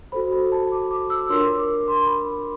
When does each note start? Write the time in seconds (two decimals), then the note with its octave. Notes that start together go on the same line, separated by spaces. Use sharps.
0.12 F#4 A4 C5 B5
0.32 B5
0.52 A5
0.72 D6
0.91 D6
1.10 E6
1.29 D4 F4 A#4 C#5 C6
1.58 D6
1.88 C6
2.07 B5